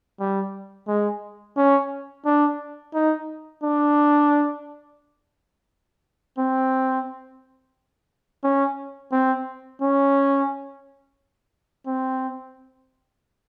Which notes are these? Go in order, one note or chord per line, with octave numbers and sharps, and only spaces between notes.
G3
G#3
C#4
D4
D#4
D4
C4
C#4
C4
C#4
C4